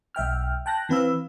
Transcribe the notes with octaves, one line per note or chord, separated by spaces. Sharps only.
B1 E5 G5 F6
G5 A5 F#6 A#6
E3 C4 B4 F5 E6